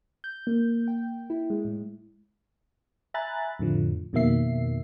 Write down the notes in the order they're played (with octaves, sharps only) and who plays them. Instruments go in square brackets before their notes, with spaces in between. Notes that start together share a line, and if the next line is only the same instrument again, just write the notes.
[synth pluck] G6
A#3
G5
E4
G#3
A2
[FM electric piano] E5 G#5 A#5 B5 F#6 A6
F2 A2 D3 F3
F2 B2 D#3 A#3 E5 C7